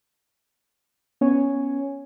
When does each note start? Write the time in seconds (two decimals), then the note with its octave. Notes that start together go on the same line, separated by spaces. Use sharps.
1.21 B3 C#4 C#5 G#5